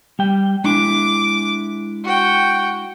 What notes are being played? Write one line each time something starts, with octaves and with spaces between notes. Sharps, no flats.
G3 G5
G#3 D4 E4 D6
F#4 G5